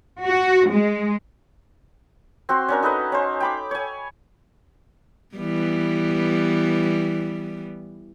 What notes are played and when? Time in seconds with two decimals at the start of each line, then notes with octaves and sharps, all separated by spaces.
0.24 F#4
0.70 G#3
2.49 C4 F#4 C6
2.68 C#4 D4 A#4
2.83 D#4 A4 B4 D#5
3.12 C#4 C5
3.40 G5 B5 D6
3.71 C#5 G#5
5.36 E3 G3 B3